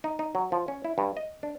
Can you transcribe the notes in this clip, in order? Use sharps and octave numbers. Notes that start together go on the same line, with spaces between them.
D#4
D#4
F#3
F3
C#4
E4
G2
D#5
D4